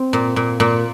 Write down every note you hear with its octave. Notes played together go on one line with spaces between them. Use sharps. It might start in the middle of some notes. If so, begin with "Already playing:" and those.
Already playing: C4
A#2
A#2
A#2